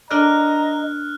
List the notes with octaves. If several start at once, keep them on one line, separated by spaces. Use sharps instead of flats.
D4 A#4 D#5 A#5 F6 F#6